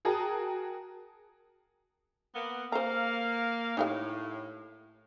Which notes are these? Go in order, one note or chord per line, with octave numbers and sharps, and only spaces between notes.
F#4 G#4 A#4 G5 A5 D#6
A#3 B3
A#3 C5 F5 A#5
A2 D#4 G4 F5